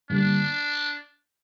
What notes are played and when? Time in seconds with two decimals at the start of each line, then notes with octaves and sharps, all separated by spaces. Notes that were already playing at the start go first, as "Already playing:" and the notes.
0.10 G2 D3 G3 A#3 D4